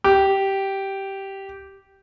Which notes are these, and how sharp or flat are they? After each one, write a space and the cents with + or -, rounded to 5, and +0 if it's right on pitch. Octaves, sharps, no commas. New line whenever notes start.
G4 -10